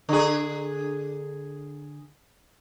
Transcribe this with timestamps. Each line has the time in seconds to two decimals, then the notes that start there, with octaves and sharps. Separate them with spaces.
0.09 D3 G#4